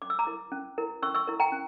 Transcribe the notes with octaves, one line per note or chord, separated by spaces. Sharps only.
C#4 D6
E6
A#5 D6
E4 A#4
C#4
E4 A#4
C#4 C#6 E6
C#6 E6
E4 A#4
G5 A#5
C#4